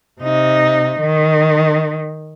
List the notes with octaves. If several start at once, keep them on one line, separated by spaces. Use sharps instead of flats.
C3 D#4
D#3